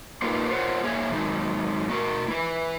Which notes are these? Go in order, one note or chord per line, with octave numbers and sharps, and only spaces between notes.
A#3 D#4 F4 G4 A#4 B4
F4 A#4 C5 C#5 D#5 F#5
A#3 G#4 C#5 E5 G#5
D#3 F#3 G#3 D#4
A3 F#4 A#4
E4 B4